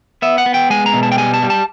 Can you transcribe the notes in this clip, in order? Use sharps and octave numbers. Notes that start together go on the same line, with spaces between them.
B3 E5
F#5
B3
G5
G#3 G#5
A#5
B2
A5
G5
G3 G#5
A5
G3
A5